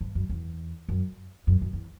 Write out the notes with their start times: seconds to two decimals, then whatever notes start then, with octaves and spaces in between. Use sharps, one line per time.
0.01 G2
0.15 F#2
0.29 E2
0.89 F#2
1.47 F#2
1.61 F#2
1.73 E2